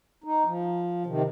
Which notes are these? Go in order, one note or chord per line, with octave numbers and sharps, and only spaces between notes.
D#4
F3
C3 D#3